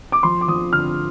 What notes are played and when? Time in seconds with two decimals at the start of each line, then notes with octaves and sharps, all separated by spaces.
0.12 D6
0.23 F3 C6
0.41 D6
0.48 F3 D#6
0.72 D3 F6